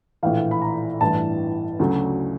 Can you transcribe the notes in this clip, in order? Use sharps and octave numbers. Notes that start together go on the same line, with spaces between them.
A#1 A2 E3 F5
B5
A#5
A1 G2 E3 A5
D2 C#3 F#3